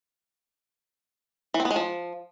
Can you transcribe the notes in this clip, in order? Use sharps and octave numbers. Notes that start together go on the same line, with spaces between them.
E3
C4
B3
G#3
F3